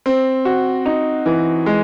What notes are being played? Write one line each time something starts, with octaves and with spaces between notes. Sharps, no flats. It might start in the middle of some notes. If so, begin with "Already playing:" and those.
C4
F#4
D#4
E3
G#3